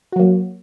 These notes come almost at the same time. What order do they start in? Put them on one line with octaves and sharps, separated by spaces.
F#4 F#3 A#3